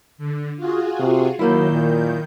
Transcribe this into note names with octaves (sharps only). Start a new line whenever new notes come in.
D3
F4 F#4 G#4
C3
F#2 D#3 F#3 A#3 E4 G6
A#2